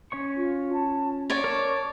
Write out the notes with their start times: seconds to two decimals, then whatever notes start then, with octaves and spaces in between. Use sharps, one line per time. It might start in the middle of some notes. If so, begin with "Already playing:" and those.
0.12 C#4 C#5 C#6
0.37 F4
0.73 A5
1.30 C#4 C#5 D5
1.44 A#4 A5 C#6